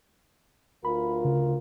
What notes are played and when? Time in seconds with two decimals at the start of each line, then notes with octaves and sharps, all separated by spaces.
0.85 D2 F4 A#4 B5
1.25 C#3